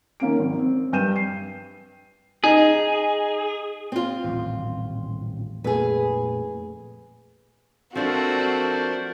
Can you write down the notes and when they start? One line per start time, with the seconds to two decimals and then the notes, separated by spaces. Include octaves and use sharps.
0.20 D#3 A#3 C#4 D7
0.39 G#1
0.59 C4
0.93 G2 G5 G6 D#7 E7
1.16 C7
2.44 D#4 G#4
3.92 C4 F4
4.25 D#1 A1
5.64 F2 A#2 A3 G#4 B4
7.95 F3 A3 C4 D4 F#4 A#4 C5 D5